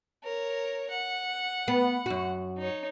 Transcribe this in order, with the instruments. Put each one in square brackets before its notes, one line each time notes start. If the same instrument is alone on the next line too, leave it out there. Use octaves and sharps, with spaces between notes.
[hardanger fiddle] A#4 C#5
F#5
[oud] B3
F#2 F#4
[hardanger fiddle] D#4 C#5